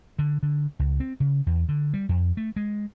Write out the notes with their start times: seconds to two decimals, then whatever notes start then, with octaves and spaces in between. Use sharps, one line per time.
0.19 D3
0.43 D3
0.79 C#2
1.00 C4
1.20 C#3
1.46 E2
1.69 D3
1.94 G3
2.09 F2
2.37 A3
2.56 G#3